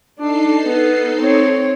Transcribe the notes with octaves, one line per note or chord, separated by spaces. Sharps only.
D4 D#4 A4 C7
B3
C4 C#5